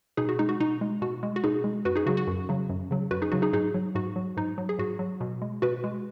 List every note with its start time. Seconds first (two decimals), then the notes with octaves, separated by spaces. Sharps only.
0.17 B2 D#4 G#4
0.29 F#4
0.39 G#3 D#4
0.49 F#4
0.60 B2 D#4
0.81 G#3
1.02 B2 F#4
1.23 G#3
1.36 F#4
1.44 B2 D#4 G#4
1.64 G#3
1.85 F#2 F#4 B4
1.95 D#4 G#4
2.06 C#3 F#3 F#4
2.17 F#4
2.27 F#2
2.49 C#3 F#3
2.69 F#2
2.91 C#3 F#3
3.11 F#2 F#4 B4
3.22 D#4 G#4
3.32 C#3 F#3 F#4
3.42 D#4 G#4
3.53 G#2 D#4 G#4
3.74 F#3
3.95 G#2 F#4
4.16 F#3
4.37 G#2 D#4
4.58 F#3
4.69 G#4
4.79 G#2 F#4
4.99 F#3
5.21 B2
5.42 G#3
5.62 B2 F#4 B4
5.84 G#3